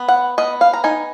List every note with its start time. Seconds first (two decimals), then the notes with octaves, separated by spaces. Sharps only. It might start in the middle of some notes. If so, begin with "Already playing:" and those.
Already playing: B3
0.08 F#5
0.38 B3 D#5
0.61 F5
0.73 A#5
0.84 D#4 G#5